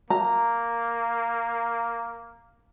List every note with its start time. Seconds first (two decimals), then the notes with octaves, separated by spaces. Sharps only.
0.10 A#3 A#5